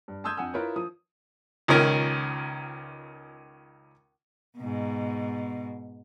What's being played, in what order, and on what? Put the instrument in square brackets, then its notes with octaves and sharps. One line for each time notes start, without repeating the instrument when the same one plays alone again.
[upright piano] G2
A5 C6 D#6 E6 G6 G#6
F2 F#5 G#5 E6
E4 F4 A#4 B4 C#5
F3 D#6
[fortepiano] C#2 A#2 D#3 C#4 A#4
[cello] G#2 B2